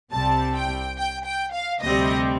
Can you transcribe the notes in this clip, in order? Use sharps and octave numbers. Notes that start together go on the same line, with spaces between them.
C2 C3 G3 C4 A5
G5
G5
G5
F5
D2 C3 G3 C4 D#5